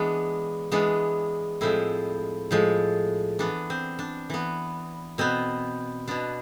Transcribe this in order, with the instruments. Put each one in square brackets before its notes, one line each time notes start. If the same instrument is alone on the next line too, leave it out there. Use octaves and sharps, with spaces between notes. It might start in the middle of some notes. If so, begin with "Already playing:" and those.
Already playing: [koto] E3 G#3 B3 D4
E3 G#3 B3 D4
A2 F3 G#3 C4 E4
A2 F3 G#3
E3 B3 D4
C4
D4
E3 B3
B2 B3 C4
B2 B3 D4